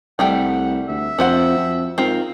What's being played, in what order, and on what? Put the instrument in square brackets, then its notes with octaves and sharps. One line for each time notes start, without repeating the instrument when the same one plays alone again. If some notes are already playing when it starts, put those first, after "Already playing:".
[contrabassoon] C2 [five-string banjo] G3 A3 G5 [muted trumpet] F#5
[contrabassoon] D2 [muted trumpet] E5
[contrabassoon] F2 [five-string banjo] F#4 C5 F#5
[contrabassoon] F2
[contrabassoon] G#2 [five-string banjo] C4 F4 [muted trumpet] A#4